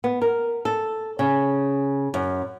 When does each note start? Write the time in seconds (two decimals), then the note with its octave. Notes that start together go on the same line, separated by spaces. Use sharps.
0.04 B3
0.22 A#4
0.65 A4
1.19 C#3
2.14 F#2